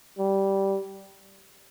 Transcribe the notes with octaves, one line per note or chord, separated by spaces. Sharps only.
G3